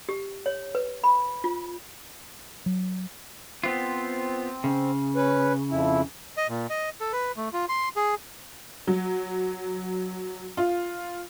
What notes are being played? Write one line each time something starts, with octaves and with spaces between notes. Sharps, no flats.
G4
C#5
B4
B5
F4
F#3
B3 C4 F4
C#3
C#4 B4
F2 E4
D#5
A#2
D#5
A4
B4
A3
F4
C6
G#4
F#3
F4